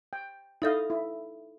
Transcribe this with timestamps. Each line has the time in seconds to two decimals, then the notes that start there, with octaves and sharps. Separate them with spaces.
0.13 G5
0.62 D#4 E4 A4 D#5 F5 G6
0.90 E4